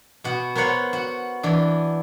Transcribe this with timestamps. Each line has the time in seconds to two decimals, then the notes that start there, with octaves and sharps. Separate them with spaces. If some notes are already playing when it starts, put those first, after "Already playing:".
0.24 B2 F#4
0.55 B3 A#4 C5 C#5 F#5
0.93 F#4
1.43 E3 D4